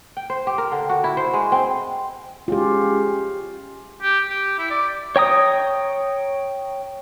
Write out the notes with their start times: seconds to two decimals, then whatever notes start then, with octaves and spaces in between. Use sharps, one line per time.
0.17 G5
0.30 C5
0.47 G4
0.58 A#4
0.72 D3
0.89 F#4
1.04 E4
1.17 C5
1.34 G#3
1.52 C4
2.48 G#3 C#4 F4 G4
4.02 G4
4.29 G4
4.59 E4
4.70 D5
5.16 C#5 G5 A#5 D#6